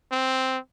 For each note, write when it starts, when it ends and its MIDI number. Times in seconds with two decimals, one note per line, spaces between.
0.11 0.58 60